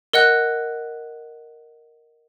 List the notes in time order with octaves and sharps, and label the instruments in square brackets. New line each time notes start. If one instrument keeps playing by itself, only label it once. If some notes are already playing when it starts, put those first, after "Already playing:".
[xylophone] A#4 D#5 F#5 F#6